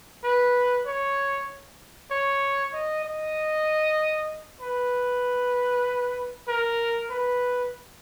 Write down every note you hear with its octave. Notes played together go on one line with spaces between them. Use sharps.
B4
C#5
C#5
D#5
D#5
B4
A#4
B4